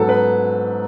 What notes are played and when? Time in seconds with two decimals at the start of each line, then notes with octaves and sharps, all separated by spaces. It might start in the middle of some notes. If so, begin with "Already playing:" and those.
Already playing: G#2 F#3 B3 A4
0.09 B4